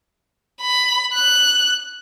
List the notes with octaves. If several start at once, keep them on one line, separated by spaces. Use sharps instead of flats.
B5
F#6